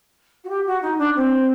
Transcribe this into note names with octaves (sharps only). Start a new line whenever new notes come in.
F#4
G4
F#4
D#4
D4
C4